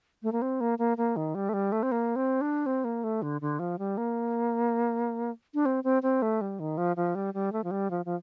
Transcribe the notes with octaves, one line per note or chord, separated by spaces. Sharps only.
A3
A#3
C4
A#3
A#3
A#3
D#3
G3
A3
G3
A3
C4
A#3
C4
D4
C4
A#3
A3
D3
D3
F3
G3
A#3
D4
C4
C4
C4
A3
G3
D#3
F3
F3
G3
G3
A3
F3
G3
F3
F3